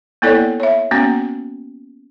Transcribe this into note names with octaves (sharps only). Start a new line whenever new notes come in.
A#3 B3 E4 A4 C#5 D5
C#5 E5
A#3 B3 C#4 F#4